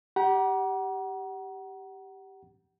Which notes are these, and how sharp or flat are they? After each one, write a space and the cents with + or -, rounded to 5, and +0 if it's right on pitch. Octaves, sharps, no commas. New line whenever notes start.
G4 +0 F#5 +25 A#5 +35